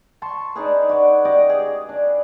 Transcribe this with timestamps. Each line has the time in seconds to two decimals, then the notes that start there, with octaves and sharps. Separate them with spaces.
0.22 A5 C6 C#6
0.55 D4 D#4 G#4 B4
0.89 F#4 D5
1.25 G4 D5 D#5 D6
1.50 G#4
1.89 D4